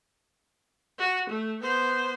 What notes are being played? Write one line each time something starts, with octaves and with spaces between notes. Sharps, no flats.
F#4
A3
B3 C5